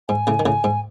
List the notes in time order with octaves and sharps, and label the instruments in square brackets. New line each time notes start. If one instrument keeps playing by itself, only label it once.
[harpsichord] G#2 [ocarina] G#5
[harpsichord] A2 C#3
D#3
[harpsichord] A2 C#3 [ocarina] G#5
[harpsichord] G#2